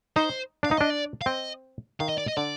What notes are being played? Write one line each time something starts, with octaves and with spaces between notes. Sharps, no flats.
D#4 C5
D4 F5
D#4
D4 D#5
D5
F5
C4 D#5
D#3 F5
D#5
D5
D#5
D3 D5